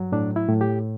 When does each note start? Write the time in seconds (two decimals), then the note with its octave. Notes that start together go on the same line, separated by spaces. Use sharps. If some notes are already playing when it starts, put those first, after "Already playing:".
Already playing: G2 F#3
0.12 A2 D4
0.36 E4
0.49 A2
0.61 G4